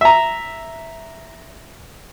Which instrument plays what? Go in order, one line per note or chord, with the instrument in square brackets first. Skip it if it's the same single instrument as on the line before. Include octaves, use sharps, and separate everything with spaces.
[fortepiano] E5 A#5